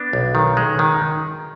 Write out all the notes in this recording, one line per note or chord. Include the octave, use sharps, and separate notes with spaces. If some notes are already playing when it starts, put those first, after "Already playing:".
Already playing: B3 D4
B1
D#3
G#3
D#3